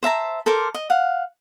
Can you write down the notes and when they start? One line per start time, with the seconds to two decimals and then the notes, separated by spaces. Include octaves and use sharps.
0.03 C5 E5 A5 A#5
0.46 A4 A#4 C5 D6
0.74 D#5
0.90 F5 F#5